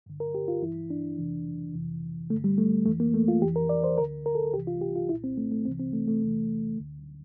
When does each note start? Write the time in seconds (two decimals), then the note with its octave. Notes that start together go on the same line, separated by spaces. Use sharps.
0.06 G2 D3
0.20 A#4
0.35 G4
0.48 F4
0.62 G2 E3 E4
0.90 D4
1.18 F2 C3 E3
1.74 F2 C3 E3
2.30 D3 A3
2.33 G2
2.44 G3
2.58 A3
2.86 F2 E3 A3
3.00 A#3
3.14 A3
3.28 F4
3.42 E3 G4
3.45 F2
3.56 A#4
3.69 D5
3.84 C5
3.98 D2 D3 A#4
4.26 A#4
4.35 A4
4.54 C2 C3 E3 G4
4.67 F4
4.82 G4
4.96 F4
5.09 C2 A#2 E4
5.24 C4
5.37 A3
5.52 A3
5.65 C2 C3 E3 C4
5.79 C4
5.93 A3
6.08 A3
6.21 E2 C3 E3
6.77 D2 D3